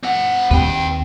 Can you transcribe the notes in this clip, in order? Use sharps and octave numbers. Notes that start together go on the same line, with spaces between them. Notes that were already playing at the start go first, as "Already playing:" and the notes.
C4 F#5
D#2 A#3 C4 B4 G5